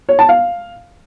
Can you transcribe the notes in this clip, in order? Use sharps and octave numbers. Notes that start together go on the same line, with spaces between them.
C#5
A5
F5